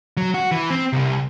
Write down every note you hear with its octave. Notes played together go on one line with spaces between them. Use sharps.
F#3
F#4
E3
C4
C2